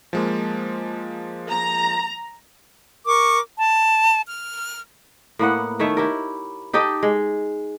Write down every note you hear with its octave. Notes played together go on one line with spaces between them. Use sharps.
F3 G#3 A#3
A#5
A#4 C#6 D6
A5
F6
A2 A#3 B3 F#5
D#3 A3 C#5 E5
E4 G4 A#4
D#4 G4 A4 D#5
G#3